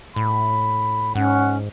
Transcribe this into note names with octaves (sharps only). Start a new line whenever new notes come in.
A2 B5
G#2 C#4 F#5